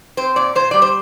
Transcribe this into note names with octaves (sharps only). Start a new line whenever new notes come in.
C4 C5
A#2 D5
A#2 C5
G3 D5
C5